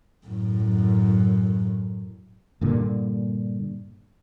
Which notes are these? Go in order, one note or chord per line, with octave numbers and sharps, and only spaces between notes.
F#2 A2
G2 A#2 D3